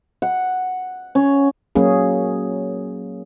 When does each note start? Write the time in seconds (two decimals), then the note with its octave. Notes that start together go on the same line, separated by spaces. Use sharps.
0.22 F#5
1.15 C#4
1.75 F#3 A#3 C#4 G#4